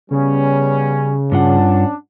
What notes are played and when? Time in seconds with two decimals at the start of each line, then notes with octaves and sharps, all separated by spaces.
0.11 C#3 G3 B3 C#4
1.32 G2 C#4 D4 F4 F#5